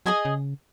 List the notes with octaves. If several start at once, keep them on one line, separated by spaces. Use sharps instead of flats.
F#3 G#4 D#5 G#5
C#3